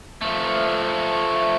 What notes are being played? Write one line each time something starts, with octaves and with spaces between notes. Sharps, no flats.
F3 A3